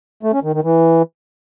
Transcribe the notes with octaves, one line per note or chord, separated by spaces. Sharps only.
A3
C#4
D#3
D#3
E3